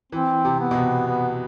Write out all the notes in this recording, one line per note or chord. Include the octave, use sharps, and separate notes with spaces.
E3 C4
C3
B3
B2
C3
B3